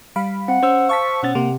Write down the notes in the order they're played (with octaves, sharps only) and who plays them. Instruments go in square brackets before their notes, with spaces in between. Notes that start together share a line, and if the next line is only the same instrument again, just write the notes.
[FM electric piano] G3 F5 B5
[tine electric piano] C4 [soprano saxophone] F#5
[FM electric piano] C#4 [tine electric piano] C5 E6
[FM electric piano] F5 A5 B6 [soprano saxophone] C#6
[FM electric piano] B2 C#4 A6 [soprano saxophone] F#5
[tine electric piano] C3 [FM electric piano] A#3